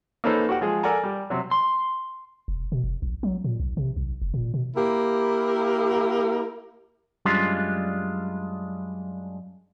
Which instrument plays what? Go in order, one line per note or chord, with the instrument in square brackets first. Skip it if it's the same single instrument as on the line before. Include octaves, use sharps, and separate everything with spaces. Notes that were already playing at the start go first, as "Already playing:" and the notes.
[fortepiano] A#3 C#4 D#4 A4 B4 C5
F#4 G4 F#5
F3 G#3 G#4
A4 A#4 D5 F#5 G#5 A#5
G3
C3 F#3
[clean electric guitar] C6
[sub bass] E1
B2
F1
A#1
F#3
A#2
B1
C3
B1
F1
A#2
B2
[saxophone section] A#3 E4 G4 A#4
[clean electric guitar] F#2 G3 G#3 D4 F4